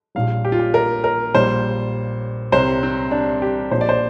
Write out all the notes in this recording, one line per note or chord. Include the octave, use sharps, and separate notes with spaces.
A#1 A#2 G3 F5
G4
F4
G4
A#4
A#4
A#1 A#2 G3 C5
C2 C3 G3 C5
C4
D4
G4
A#1 A#2 F3 C5
D5
C5